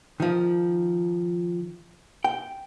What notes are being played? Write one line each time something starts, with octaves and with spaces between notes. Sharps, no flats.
D#3 F3
G5